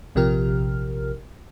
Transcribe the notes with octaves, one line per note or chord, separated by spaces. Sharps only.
A#1 C3 F3 G4 A#4 F6